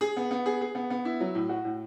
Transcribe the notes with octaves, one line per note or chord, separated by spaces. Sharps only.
G#4
B3
B3
G#4
G#4
B3
B3
E4
F#3
A2
F#4
A2